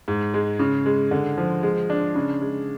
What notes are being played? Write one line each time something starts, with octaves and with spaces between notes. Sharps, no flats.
G#2
G#3
C#3
G#3
D3
F3
G#3
D4
C#3
G#3